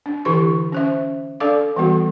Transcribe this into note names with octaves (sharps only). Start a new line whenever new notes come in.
D4
D3 E3 E4 G4 C6 C#6
C#4 C5 E5
D4 A4 D5 F5 D6
E3 G3 B3 F#4 A4